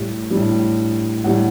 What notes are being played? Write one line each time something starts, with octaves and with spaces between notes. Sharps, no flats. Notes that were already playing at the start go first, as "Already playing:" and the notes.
Already playing: A2 G3
G3
A2
A2 G3 F#5